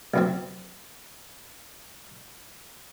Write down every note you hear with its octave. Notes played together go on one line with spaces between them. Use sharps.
C2 F#2 C4